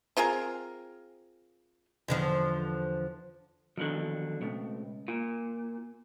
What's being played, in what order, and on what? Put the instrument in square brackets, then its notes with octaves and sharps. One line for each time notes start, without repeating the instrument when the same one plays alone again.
[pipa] C4 F4 G#4 A#4
[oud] E2 D3 F3
[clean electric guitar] B1 F2 D3 [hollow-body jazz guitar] D#3 F#3
[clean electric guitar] C#2 [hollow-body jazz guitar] B2 A3 C4
[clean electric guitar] A#2 [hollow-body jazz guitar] F4